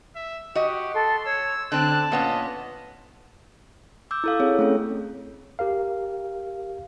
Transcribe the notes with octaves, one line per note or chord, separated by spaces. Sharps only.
E5
F#4 G4 D#5
A4 C6
C#5 E6
D3 C4 A5 F#6
A#2 B3 C#4 D#5
D6 E6 G6
E4 A4 F5
C4 G#4 C#5
A3 C#4 G#4 A4
G4 A#4 F5